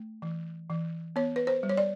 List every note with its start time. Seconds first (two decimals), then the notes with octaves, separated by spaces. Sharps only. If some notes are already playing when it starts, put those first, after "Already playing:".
Already playing: A3
0.22 E3
0.70 E3
1.16 B3 C#5
1.36 B4
1.47 C5
1.63 G3
1.69 C#5
1.77 D5